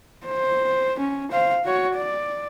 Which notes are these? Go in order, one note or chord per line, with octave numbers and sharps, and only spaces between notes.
C5
C#4
C5 F5
F#4 C#5
D5